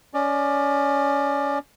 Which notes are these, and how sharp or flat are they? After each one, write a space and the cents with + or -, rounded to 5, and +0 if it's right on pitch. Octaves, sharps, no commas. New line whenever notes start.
C#4 +20 D5 +25